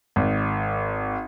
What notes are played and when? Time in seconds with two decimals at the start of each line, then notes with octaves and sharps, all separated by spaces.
0.16 G#1